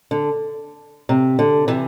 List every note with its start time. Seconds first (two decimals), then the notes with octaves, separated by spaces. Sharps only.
0.11 D3
1.09 C3
1.39 D3
1.68 C3 E3